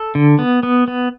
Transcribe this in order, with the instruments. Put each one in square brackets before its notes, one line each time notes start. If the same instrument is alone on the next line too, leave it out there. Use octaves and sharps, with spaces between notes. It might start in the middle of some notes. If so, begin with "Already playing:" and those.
Already playing: [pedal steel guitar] A4
D3
B3
B3
B3